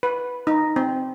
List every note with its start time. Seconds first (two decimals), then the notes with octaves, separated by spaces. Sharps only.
0.03 B4
0.47 D#4
0.76 C4